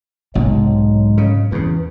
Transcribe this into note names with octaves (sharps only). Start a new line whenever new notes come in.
B1 G#2 C3 F#3 G#3
C#3
E2 C#3 E3